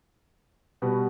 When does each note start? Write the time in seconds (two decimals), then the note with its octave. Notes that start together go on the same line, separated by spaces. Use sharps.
0.82 B2 G3 B3 F#4